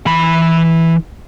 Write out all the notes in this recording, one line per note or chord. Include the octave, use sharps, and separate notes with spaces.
E3 B5